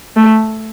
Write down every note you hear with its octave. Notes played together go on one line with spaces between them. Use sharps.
A3